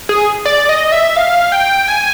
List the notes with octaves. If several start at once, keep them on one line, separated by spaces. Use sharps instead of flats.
G#4
D5
D#5
E5
F5
G5
G#5